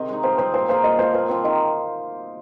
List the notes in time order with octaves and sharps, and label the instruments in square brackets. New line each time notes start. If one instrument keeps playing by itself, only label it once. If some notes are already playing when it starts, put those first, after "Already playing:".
Already playing: [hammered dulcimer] C3 D#3 C4 G#4 [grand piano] D#5
[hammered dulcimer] G#3 D#4
[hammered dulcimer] F3 [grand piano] C5
[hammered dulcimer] C4 G#4 [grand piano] C5
[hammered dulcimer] A#2 [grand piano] C5
[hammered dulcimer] F3 A#3 G#4 [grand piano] C5
[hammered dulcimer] A#2 [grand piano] D#5
[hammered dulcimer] F3 G#3 [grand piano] C5
[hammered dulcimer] A#2 [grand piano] C5
[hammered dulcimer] F3 C4 [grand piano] C5
[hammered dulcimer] D#3 [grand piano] D#5